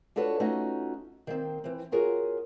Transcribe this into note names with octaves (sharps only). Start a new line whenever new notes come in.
D4 F4 F#4 A4 B4 C#5
A3 C#4 D#4 F4 F#4
D#3 A#3 C4
E3 C4
B3 F4 F#4 G#4 A#4 C#5